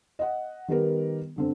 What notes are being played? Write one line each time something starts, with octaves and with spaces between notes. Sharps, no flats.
D#5 F#5
D#3 G3 B3 G4 A#4
G2 D3 C4